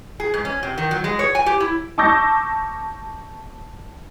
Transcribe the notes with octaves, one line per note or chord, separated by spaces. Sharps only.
G#4
G#2
C#4
C3
D#3
F#3
G#3
C#5
G#5
G4
E4
A5 C#6 D6 E6 G6 A#6